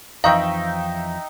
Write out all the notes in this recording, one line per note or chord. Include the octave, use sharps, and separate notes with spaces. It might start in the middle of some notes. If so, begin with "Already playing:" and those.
F2 E3 F3 D#4 E5 F5 G5 C#6